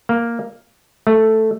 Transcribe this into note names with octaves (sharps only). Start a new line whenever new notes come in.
A#3
A3